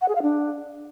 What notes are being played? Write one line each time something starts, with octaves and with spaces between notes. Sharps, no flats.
F#5
G#4
F5
D4